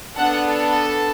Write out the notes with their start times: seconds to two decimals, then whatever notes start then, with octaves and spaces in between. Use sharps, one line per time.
0.15 B3 D4 A4 F#5
0.45 A4